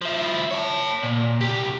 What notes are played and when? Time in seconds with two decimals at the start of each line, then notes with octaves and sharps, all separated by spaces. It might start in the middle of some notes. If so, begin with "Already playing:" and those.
0.02 F3 E4
0.51 C#5 A5
1.03 A#2
1.41 C2 G4